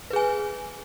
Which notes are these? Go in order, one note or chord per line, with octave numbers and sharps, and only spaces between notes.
G#4 B4 G#5